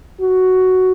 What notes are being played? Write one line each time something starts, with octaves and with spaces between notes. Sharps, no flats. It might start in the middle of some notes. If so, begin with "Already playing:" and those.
F#4